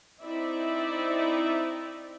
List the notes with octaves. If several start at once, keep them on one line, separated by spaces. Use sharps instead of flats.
C4 D#4 E4 D5 E5